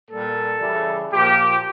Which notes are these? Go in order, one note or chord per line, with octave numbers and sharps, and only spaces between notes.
A#2 G3 A4
C#3 E3 G3
A#2 F3 G4